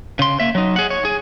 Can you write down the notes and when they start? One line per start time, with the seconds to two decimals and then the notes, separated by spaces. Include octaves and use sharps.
0.19 C#3 C6
0.40 A#3 E5
0.55 F#3 D#4
0.76 G#4 F#5
0.90 C#5
1.05 G#4